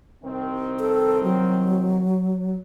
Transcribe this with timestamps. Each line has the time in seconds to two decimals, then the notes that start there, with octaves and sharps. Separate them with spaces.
0.24 C2 D#3 C4
0.80 A4
1.24 F#3